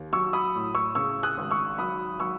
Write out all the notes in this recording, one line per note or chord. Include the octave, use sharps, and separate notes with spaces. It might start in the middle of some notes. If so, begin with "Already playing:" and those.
Already playing: D#2
F#3 C#6 E6
B5 D#6
A2
C#6 E6
C#3 C#6 E6
D#6 F#6
G#1
C#6 E6
F#3 B5 D#6
F#3 C#6 E6